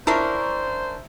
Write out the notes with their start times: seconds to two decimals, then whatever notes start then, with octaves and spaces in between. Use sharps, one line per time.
0.07 C#4 D4 E4 A#4 C5 A5 A#5